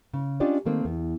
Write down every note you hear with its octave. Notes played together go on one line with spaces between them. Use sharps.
C#3
C#4 D4 F4 G4 D5 D#5
D#3 A3 A#3 C4
E2